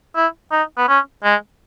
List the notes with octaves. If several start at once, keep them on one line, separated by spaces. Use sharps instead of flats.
E4
D#4
B3
C#4
G#3